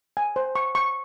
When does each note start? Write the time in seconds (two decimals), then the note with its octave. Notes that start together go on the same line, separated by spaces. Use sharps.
0.17 G#5
0.36 C5
0.55 C#6
0.75 C#6